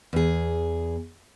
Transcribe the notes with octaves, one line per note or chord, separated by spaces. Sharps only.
E2 G#4